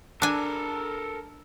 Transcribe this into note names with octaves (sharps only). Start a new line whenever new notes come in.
D4 A4 A#4 G#5